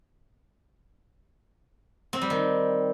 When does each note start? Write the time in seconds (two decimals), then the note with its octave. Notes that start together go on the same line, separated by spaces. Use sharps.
2.13 C4
2.22 G3
2.30 D#3